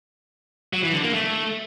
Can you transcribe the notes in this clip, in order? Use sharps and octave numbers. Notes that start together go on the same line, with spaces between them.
F#3
E3
D3
A#3
A3